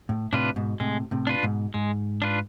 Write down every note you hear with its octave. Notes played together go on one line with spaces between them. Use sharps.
A2
A2 C3 D4 F4 B4
G#2 B2
A2 C3 G#3
A2 C3
D4 F4 B4
G#2 B2
G#2 G#3
D4 F4 B4